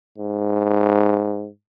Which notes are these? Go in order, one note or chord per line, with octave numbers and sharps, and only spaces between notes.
G#2